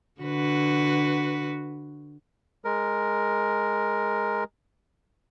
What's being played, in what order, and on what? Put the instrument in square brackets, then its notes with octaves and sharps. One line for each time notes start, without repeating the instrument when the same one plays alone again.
[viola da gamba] D3 F#4 B4
[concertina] G#3 A#4